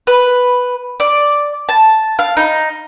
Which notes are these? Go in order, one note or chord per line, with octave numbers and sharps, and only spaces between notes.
B4
D5
A5
F5
D#4